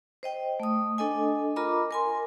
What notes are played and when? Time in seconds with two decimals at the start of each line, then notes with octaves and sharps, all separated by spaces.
0.23 C5 D#5 G5
0.60 A3 D#6
0.98 D4 A4 D#5 G#5
1.56 F4 A#4 D#5 A#5 B5 D6
1.91 A#4 G#5 C6